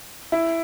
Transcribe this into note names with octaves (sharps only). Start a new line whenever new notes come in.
E4